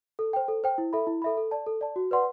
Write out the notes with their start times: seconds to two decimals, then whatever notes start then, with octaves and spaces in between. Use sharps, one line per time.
0.19 A4
0.33 C5 G5
0.48 A4
0.64 C5 G5
0.78 E4
0.93 A4 E5 B5
1.07 E4
1.22 A4 E5 B5
1.37 A4
1.51 D5 A5
1.66 A4
1.81 D5 A5
1.96 F#4
2.11 B4 D5 F#5 C6